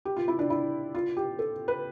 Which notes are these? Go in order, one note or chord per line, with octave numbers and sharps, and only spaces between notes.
G4
F4
E4
D4
E4
F4
G4
A4
B4